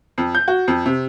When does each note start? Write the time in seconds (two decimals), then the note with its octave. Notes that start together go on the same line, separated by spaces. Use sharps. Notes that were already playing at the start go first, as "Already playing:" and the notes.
0.18 F2
0.35 G6
0.48 F#4
0.68 F2
0.86 C3